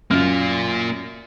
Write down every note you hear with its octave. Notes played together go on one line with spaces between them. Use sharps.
F#2 A#3 F4 F6